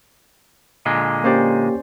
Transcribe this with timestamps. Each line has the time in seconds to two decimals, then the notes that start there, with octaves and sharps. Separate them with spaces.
0.86 A#2 D3 G#3
1.24 A#3 C#4 G4 C5 D5